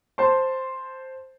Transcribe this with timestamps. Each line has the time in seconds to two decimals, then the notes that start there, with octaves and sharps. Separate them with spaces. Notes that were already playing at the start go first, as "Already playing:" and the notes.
0.18 C5 A5 C6